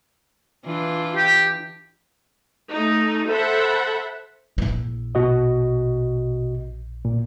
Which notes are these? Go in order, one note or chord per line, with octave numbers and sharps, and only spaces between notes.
E3 D4 F4
G4
A3 D#4
A4 C5 E5 F#5 B5
A#1 E4
B2 F#4 D#5
A#2